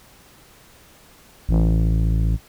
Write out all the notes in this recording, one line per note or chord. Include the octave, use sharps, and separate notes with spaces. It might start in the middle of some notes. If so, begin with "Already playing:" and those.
A1